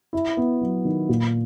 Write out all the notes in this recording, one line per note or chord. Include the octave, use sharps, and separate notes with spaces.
E4
B3
F#3
D#3
A#2